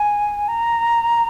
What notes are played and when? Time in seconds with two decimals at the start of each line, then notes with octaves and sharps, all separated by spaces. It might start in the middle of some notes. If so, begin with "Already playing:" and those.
Already playing: G#5
0.48 A#5